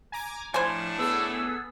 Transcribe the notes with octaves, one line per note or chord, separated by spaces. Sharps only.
G#5 A#5 D6
A2 F3 D4 E4 C5 G#5
B3 G#4 A4 E6